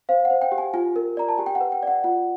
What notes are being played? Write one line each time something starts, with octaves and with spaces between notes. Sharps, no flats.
C5 F5
F#5
C5
G5
G4
G#5
F4 G#5
A#4
D5 A#5
A5
G4 G#5
G5
F#5
B4
G5
D5 F#5
F4 F#5